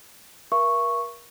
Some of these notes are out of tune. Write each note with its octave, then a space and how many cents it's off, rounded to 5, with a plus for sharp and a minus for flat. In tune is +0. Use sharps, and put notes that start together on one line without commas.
A#4 +35 E5 +45 C#6 -5